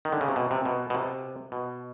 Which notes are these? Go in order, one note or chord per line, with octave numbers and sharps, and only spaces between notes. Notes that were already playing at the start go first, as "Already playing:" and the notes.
D#3
D3
C#3
C3
B2
C3
B2
B2
C3
B2